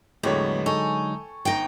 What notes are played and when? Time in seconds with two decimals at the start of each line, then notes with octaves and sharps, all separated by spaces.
0.23 E2 A2 D3 F#3 G#3 B3 G4 C#5
0.66 D#4 A4 G#5 C#6
1.45 G1 D#4 G5 A#6